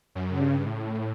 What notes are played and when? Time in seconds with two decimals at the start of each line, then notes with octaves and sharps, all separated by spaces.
0.15 F#2
0.29 C#3
0.41 G2
0.66 A2